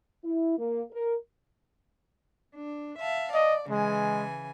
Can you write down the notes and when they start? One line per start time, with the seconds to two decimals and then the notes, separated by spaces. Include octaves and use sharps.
0.23 E4
0.58 A#3
0.92 A#4
2.55 D4
3.00 E5 F5 A5
3.34 D5 D#5
3.70 C#3 E3 G#3 G#5